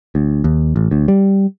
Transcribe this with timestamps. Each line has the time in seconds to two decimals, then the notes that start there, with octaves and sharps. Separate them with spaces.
0.15 D2
0.44 D#2
0.76 A1
0.91 D2
1.08 G3